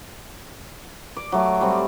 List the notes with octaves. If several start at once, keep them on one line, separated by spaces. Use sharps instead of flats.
D5
F#3 A3 G#5
G3 C4